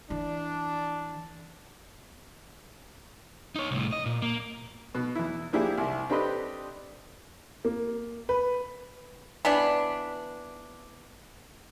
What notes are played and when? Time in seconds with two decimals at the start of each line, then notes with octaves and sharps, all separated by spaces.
0.10 E3 D4
3.56 D#4 C#5
3.71 C2 A2
3.92 D#5
4.06 A#2
4.22 A#3
4.95 B2
5.15 E2 E4
5.53 F3 A#3 D4 E4 G4 G#4
5.77 C2 C3
6.09 C4 D4 G4 A4 B4 D#5
7.65 A#3
8.29 B4
9.45 E3 B3 D4